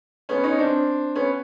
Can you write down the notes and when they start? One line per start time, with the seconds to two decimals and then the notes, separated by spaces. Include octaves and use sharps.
0.29 B3 C#4
0.44 C#4 D#4
0.58 C4 D4
1.15 B3 C#4